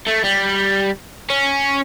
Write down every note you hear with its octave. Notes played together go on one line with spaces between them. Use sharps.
A3
G3
C#4